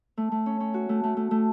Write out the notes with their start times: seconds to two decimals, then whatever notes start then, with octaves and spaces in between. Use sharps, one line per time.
0.17 A3
0.32 A3
0.46 C#4
0.60 C#4
0.74 F#4
0.89 A3
1.04 A3
1.17 A3
1.31 A3